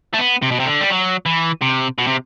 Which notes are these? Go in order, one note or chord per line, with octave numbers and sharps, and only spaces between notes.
A3
B3
C3
B2
C3
D3
G3
F#3
E3
C3
B2
C3